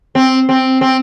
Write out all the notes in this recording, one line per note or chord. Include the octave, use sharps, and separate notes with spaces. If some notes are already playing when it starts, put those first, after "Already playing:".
C4
C4
C4